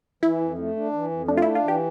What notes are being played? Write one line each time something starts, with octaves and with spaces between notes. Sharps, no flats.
E3 E4
F2
A3
D4
E3
F2
A3 D4
F4
D4 E4
F4
E3 G4